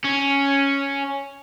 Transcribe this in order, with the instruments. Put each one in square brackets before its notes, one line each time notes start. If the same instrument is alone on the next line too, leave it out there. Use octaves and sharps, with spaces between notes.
[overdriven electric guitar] C#4